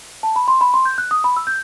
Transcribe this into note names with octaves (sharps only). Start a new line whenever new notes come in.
A5
B5
C6
B5
C6
G6
F#6
D#6
B5
E6
G6